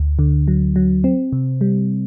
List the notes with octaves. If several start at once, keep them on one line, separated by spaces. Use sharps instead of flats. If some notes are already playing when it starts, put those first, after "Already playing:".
Already playing: D2
D3
F#3
F#3
C4
C3
G3